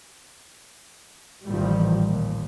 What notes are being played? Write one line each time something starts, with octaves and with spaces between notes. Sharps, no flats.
A1 A#2 D#3 F3 G3
D#2 A#2